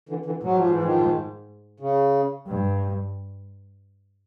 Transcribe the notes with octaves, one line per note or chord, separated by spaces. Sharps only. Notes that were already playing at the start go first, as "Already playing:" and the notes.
D3 E3
D3 E3
G#2 F#3
F3
E3
D#3 F3
C#3
G2